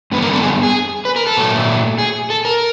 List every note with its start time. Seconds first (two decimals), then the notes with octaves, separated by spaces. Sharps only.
0.12 F#2 D3 G3 B3 B4
0.23 A#4
0.33 A4
0.43 G#4
0.63 G#4
1.05 B4
1.16 A#4
1.27 A4
1.37 A#2 F#3 A3
1.98 G#4
2.30 A4
2.45 A#4